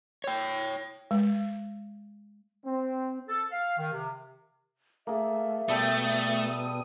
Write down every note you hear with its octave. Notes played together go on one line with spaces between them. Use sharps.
C#5 G5
G#3
C4
A4
F5
D#3
C3
A3 A#3 G#4 E5
B2 G3 A3 A4 G5 D#6